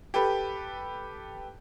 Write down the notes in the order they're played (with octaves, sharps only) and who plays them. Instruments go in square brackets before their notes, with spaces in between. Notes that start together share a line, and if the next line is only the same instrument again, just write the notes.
[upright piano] G4 A4 B4